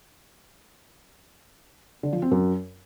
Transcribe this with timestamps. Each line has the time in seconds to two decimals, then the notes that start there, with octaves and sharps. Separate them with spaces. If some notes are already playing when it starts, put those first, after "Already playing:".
2.03 D3
2.13 F3
2.22 C4
2.31 F#2